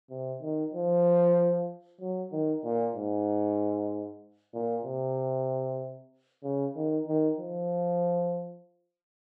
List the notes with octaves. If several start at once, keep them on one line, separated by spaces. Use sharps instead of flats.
C3
D#3
F3
F#3
D#3
A#2
G#2
A#2
C3
C#3
D#3
D#3
F3